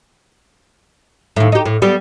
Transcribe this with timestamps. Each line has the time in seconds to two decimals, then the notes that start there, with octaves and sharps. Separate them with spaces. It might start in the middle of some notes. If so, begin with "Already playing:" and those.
1.36 D#2 A2
1.52 D#4 G4
1.66 A2
1.82 G3 B3